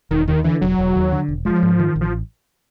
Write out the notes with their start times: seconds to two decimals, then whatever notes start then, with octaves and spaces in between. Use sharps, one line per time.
0.11 E1 D#3
0.28 D#2 D#3
0.44 D3 E3
0.61 E1 F#3
0.79 E1
0.95 D#2
1.12 D3
1.29 E1
1.45 F3 G#3
1.63 G#2
1.80 D#3
1.96 A1
2.01 F3